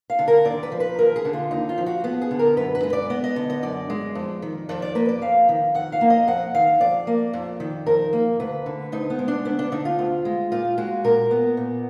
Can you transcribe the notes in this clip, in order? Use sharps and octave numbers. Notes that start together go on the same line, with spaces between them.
F5
D3
A#4
D#2 D5
B4
F3
B4
D#2 A#4
G#4
D3
F4
D#2 D#4
F4
F3
F#4
B3 G#4
G#4
D3
A#4
F#2 B4
B4
G#3
D5
B3 D#5
D#5
D3
D#5
F#2 D5
G#3
F2
D#3
F2 D5
D5
A#3 B4
D5
F2 F5
D#3
F2 F#5
F5
A#3
D#5
F2 F#5
D#3 F5
F2 D5
A#3
F2
D#3
F2 A#4
A#3
D2 B4
D3
D2 D#4
B3
G#3
D4
D2 B3
D4
D3 D#4
F4
D2
G#3
A#2 F4
G#3 F#4
A#2 A#4
B3
A#2